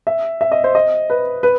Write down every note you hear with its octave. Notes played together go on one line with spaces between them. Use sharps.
E5
E5
D#5
C5
D#5
B4
B4